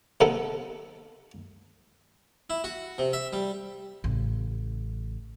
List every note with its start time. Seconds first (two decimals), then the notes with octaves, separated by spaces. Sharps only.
0.21 C3 A#3 B3 D#4 A4
2.50 E4
2.64 F#4
2.98 C3
3.13 E5
3.33 G3
4.04 A1 C#3